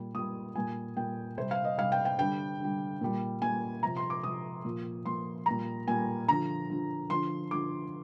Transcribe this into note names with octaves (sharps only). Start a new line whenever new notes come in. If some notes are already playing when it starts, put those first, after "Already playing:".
Already playing: A#2 G3
A#2 G3 D#6
A#2 G3 G#5
A#2 G3 G5
C3 G3 C5
F5
D#5
C3 G3 F5
G5
G5
D3 G3 G5
D3 G3
A#2 G3
A#2 G3 G#5
C3 F3 A#5
C6
D6
C3 F3 D#6
A#2 F3
A#2 F3 C6
A#2 G3 A#5
A#2 G3 G#5
D3 F3 A#5
D3 F3
D3 F3 C6
D3 F3 D6